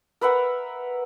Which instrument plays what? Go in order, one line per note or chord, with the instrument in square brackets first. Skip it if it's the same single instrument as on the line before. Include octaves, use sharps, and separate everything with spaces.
[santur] A#4 B4 E5 F#5